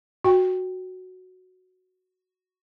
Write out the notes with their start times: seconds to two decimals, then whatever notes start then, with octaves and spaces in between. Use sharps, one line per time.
0.24 F#4 G5